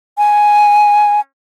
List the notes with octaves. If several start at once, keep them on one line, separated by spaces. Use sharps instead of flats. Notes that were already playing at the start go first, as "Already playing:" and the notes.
G#5